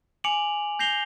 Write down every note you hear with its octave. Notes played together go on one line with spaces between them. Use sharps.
G#5 D6 C#7 D7 F7 F#7
G6 A#6 C7 F7 G7